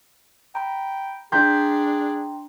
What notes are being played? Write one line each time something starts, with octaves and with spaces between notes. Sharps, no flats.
G5 A#5 B5
D4 G#4 G5 A#5 C6 G6 B6